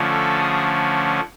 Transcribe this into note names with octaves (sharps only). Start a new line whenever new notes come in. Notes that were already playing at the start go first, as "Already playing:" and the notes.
Already playing: D3 F3 A3 C#4
A4
G#4